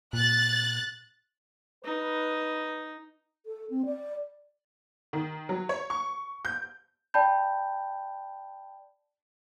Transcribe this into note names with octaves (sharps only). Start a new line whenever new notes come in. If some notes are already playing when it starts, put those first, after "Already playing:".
A#2 F#6 A6
D#4 B4
A4
C4
D5
D#3
F#3
C#5
C#6
G6
D5 G5 A5 B5 G6